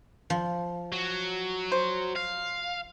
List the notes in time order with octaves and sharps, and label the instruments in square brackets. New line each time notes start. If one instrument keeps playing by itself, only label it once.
[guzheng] F3
[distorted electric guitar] F#3
[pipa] C5
[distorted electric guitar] F5